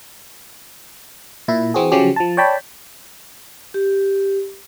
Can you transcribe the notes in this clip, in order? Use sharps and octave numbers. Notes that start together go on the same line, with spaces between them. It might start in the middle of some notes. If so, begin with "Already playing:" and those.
A#2 E4
E3 C4 F#4 G#4
C#3 F3 F#3 C#4 G4
F3 A5
C#5 D5 G5 A5 B5
G4